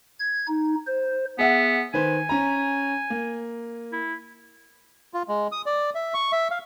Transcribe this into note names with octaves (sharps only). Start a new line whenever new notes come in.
G#6
D#4
C5
B3 G#4 E5 F#5
D#3 B4 C5 G#5
C#4 A#5
A#3
E4
F4
G#3
D#6
D5
E5
C#6
E5
F5